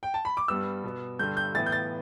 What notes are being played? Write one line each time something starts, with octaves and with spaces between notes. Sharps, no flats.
G5
A5
B5
D6
G2 G3 B3 E6
B2 B3
G2 D3 G3 G6
G6
A2 E3 B3 A6
G6
A6